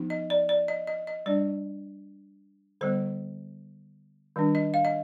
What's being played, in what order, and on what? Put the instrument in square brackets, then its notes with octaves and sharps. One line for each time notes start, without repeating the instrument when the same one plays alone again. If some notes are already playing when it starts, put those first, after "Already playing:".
Already playing: [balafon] F3 B3 D#4
D#5
D5
D5
D#5
D#5
D#5
G3 D4 D5
D3 G3 B3 C5
D#3 G3 D4
D#5
F5
D#5